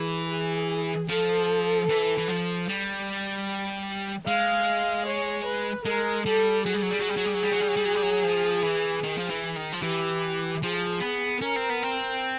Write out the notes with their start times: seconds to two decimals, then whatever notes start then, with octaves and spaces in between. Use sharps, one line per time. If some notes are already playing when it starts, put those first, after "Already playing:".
Already playing: E3 G#4
0.30 G#4
1.09 F3 A4
1.89 E3
2.18 E3
2.28 F3
2.69 G3
4.27 G#3 F5
5.06 C#5
5.46 B4
5.85 G#3 A#4
6.25 G3 A4
6.65 F#3 G#4
6.74 G3
6.82 F#3
6.91 G3
7.00 F#3
7.09 G3
7.16 F#3
7.26 G3
7.34 F#3
7.42 G3
7.52 F#3
7.60 G3
7.68 F#3
7.76 G3
7.85 F#3
7.95 G3
8.03 F#3
8.24 F3
8.63 E3
9.04 D#3
9.18 F3
9.30 E3
9.56 D#3
9.72 F3
9.82 E3 G4
10.63 F3 G#4
11.01 B3
11.41 C#4 A#4
11.56 C4
11.69 B3
11.83 C4